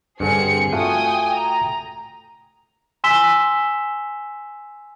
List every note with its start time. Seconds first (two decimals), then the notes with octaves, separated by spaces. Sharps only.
0.20 G2 D3 C4 G#4 C#7
0.73 A3 F4 F#4 G5 G#5 D#6
1.33 A#5
3.04 G#5 C6 E6 B6 E7 G7